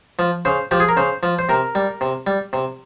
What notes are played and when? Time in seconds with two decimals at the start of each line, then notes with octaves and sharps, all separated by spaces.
0.19 F3
0.45 C#3 C5
0.71 F3 G4
0.80 G#4
0.89 A#4
0.97 C#3 C5
1.23 F3
1.39 C5
1.49 C3 A#4
1.75 G3
2.01 C3
2.27 G3
2.53 C3